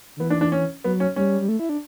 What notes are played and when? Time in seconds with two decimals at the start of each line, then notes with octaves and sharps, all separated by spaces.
0.17 D3
0.20 E3 B3
0.30 D4
0.41 D4
0.52 C#4
0.84 F#3 B3
1.00 C#4
1.16 G3 C#4
1.41 G3
1.49 A3
1.60 E4
1.69 D4